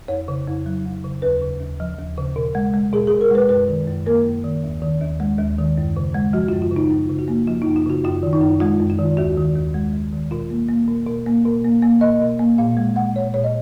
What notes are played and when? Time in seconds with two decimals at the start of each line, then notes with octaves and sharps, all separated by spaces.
0.08 F2 C#5
0.28 C#3
0.47 F2
0.66 F#3
0.85 F2
1.04 C#3
1.22 D#2 B4
1.41 C#3
1.60 D#2
1.80 F3
1.98 D#2
2.18 C#3
2.36 B2
2.55 G#3
2.73 G#3
2.92 B2 G#4
3.07 G#4
3.12 B2
3.21 A#4
3.31 G#3 B4
3.49 F#2 B4
3.68 D#3
3.88 F#2
4.06 A#3 A#4
4.26 F#2
4.44 D#3
4.64 D#2
4.82 D#3
5.02 D#2
5.20 G#3
5.39 D#2
5.58 D#3
5.78 F#2
5.96 C#3
6.14 G#3
6.33 F3 F#4
6.48 F4
6.53 F#2
6.62 F4
6.71 C#3
6.76 D#4
6.91 F#2 F4
7.09 C#3
7.19 F#4
7.28 A#3
7.47 F3 F4
7.62 D#4
7.66 F#2
7.76 F4
7.86 C#3 F#4
8.04 F#2 F4
8.23 D#3
8.33 D#4
8.42 F#2
8.60 G#3 F4
8.80 F#2
8.90 F4
8.99 D#3
9.17 D#2 F#4
9.37 D#3
9.56 D#2
9.74 G#3
9.93 D#2
10.13 D#3
10.31 B2 F4
10.50 A#3
10.69 A#3
10.88 B2
11.07 B2
11.26 A#3
11.45 B2
11.64 A#3
11.83 A#3
12.01 B2 D#5
12.21 B2
12.39 A#3
12.58 A#2 F5
12.77 G#3
12.96 G#3 F#5
13.15 A#2 C#5
13.34 A#2 C#5
13.44 D#5